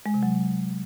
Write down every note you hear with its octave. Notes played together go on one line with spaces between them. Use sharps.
G#3
C3
F#3